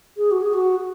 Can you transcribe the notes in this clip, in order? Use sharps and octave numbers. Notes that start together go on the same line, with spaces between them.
G#4
F#4
G#4
F#4